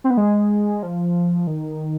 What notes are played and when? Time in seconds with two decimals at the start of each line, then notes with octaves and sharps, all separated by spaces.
0.04 C4
0.10 B3
0.17 G#3
0.83 F3
1.47 D#3